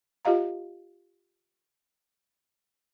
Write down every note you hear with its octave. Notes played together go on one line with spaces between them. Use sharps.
F4 G4 D#5 F5 A#5